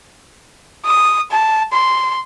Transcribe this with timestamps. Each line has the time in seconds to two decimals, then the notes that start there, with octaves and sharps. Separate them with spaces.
0.85 D#6
1.31 A5
1.73 C6